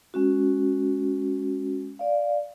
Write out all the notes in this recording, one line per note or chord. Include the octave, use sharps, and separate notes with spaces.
G#3 C#4 F#4
D5 F5